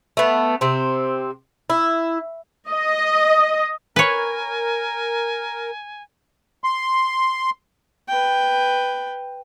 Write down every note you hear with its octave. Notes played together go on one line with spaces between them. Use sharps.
A3 B3
C3 C4
E4
D#5
A#4 B4 C#5 G#5
C6
B4 G5